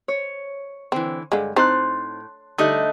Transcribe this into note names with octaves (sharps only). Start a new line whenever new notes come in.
C#5
D3 E3 C4
G2 D3 G#3
A2 C4 D#4 C5 A5 C6 F#6
D3 G3 A3 D#4 D#5 F#6